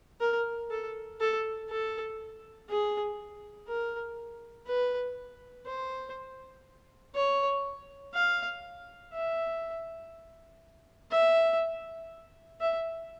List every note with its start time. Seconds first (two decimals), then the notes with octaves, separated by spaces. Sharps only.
0.21 A#4
0.71 A4
1.20 A4
1.69 A4
2.69 G#4
3.68 A#4
4.67 B4
5.66 C5
7.15 C#5
8.15 F5
9.13 E5
11.11 E5
12.61 E5